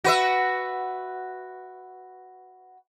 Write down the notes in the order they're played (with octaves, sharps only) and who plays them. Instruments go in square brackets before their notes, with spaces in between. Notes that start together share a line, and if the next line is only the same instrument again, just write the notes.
[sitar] F#4 B4 E5